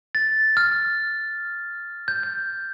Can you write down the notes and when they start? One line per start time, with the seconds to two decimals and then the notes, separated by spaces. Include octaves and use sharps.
0.15 A6
0.57 F6
2.08 G6
2.23 G6